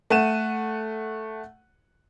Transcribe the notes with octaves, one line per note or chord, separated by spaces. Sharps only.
A3 F#5 D#7 E7